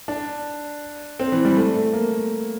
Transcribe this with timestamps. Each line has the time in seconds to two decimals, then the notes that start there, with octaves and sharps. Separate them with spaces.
0.08 D4
1.20 C4
1.32 E3
1.45 G3
1.56 A3
1.75 A3
1.93 A#3